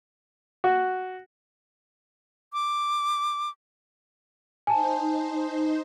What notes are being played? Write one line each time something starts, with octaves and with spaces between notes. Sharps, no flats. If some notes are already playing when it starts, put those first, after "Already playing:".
F#4
D6
D#4 C5 G#5 A5